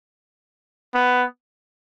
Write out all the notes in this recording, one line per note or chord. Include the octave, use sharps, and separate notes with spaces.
B3